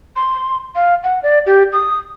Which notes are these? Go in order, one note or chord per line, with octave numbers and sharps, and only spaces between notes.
C6
F5
F#5
D5
G4
D#6